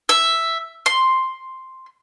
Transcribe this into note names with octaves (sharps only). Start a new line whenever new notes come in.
E5
C6